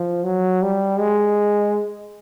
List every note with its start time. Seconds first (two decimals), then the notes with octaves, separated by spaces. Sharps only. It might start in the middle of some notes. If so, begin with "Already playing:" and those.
Already playing: F3
0.24 F#3
0.62 G3
0.99 G#3